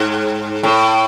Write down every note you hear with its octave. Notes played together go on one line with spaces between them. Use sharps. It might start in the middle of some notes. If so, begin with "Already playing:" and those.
Already playing: G#2
A2